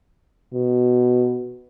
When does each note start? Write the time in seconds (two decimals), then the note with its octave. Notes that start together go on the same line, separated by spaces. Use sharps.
0.54 B2